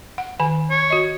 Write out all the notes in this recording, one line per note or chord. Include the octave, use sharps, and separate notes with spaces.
F#5
D#3 G#5
C#5
F#4 D#5